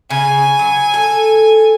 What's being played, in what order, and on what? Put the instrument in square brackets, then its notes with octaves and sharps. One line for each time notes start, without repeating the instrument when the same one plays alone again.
[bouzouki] C#3 [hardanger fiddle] G#5
[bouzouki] F#3
A4